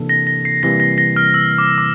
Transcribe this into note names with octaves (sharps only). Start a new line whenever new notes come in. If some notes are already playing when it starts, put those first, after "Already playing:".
Already playing: C3 E3 A#3 D4 A4
A#6
A#6
C7
C3 E3 G3 A#3 A#6
A#6
A#6
F6
E6
D6
D6